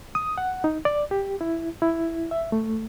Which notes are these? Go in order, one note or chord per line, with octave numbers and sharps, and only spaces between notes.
D#6
F#5
D#4
D5
G4
E4
E4
E5
A3